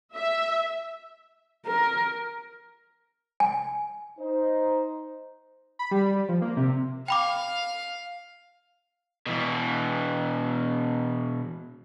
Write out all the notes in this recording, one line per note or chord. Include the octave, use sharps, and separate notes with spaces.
E5
A#4
G#5
D#4 C5
B5
G3
F3
A#3
C3
F5 G5 B5 D6
B2 E3